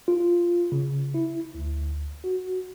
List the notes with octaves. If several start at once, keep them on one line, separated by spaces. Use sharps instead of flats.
F4
C#3
E4
D2
F#4